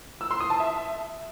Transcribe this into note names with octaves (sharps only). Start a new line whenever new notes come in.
E6
C6
D#6
A5
E5